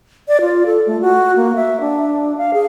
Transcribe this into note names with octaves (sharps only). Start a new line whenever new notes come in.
D5
F4
A4
A3
F#4
A#3
E5
D4
F5
G#4